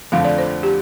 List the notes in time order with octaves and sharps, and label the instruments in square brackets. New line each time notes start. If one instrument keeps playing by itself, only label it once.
[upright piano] F2 D3 F3 A3 [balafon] F5
[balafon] D5
C5
G4